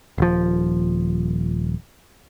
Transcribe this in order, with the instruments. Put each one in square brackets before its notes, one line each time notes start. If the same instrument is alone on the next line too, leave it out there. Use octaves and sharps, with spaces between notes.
[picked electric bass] D#1 F3